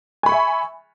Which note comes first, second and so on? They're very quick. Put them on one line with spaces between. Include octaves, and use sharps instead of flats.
G#5 B5 C#6 E5